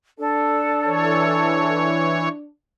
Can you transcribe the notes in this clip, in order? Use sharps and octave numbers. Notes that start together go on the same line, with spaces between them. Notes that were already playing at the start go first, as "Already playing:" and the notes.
D4 A4
E3 C#5